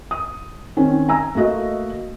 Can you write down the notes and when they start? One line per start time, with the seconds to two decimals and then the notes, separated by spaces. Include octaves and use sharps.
0.11 D#6
0.77 D#3 C4 C#4
1.09 G#5 A#5 E6
1.35 A3 A#3 F#4 D#5